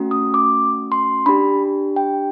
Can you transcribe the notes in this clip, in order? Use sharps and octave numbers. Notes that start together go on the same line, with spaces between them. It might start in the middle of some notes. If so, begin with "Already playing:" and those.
Already playing: A3 C#4 F#4
D#6
D6
C6
D4 G4 B5
G5